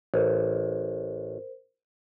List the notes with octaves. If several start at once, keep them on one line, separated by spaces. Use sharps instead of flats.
A1 A#4 C5